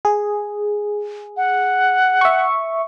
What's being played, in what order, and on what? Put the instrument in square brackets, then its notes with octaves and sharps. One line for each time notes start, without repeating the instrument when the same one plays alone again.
[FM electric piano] G#4
[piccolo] F#5
[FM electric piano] E5 C#6